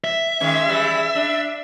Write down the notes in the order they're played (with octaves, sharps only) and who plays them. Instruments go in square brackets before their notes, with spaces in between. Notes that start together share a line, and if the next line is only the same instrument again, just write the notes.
[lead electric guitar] E5
[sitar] D#3 G#3 C#4
E3 G3 G#3
D4